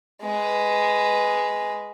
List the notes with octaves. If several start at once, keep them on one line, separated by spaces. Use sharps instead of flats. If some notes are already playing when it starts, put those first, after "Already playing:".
G#3 B4